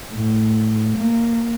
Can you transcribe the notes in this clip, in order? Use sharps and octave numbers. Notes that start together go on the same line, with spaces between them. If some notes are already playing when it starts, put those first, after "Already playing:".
A2
A#3